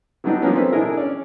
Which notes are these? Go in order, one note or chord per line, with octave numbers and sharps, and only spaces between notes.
E3 F#3 G3 B3 D4 D#4
F3 G3 A#3 B3 C#4
C4 A4 B4
B2 E3 D4 E4 G#4 A#4
C#4 C#5 D5